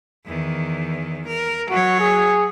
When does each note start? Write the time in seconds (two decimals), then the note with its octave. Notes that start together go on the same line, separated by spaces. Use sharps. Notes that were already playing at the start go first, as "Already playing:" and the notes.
0.26 E2 D#3
1.27 A#4
1.70 F#3 F#4 C#5
2.00 G#4